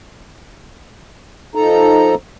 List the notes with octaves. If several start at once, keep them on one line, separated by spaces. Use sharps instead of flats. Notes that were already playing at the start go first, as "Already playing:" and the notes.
F3 D#4 A4 A#5